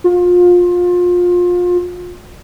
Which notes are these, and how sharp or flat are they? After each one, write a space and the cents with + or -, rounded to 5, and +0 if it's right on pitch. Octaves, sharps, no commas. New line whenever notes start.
F4 +25